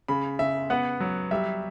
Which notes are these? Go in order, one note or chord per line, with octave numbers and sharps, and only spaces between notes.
C#3 B5
C#3 E5
B3 F#5
F#3
G3 E5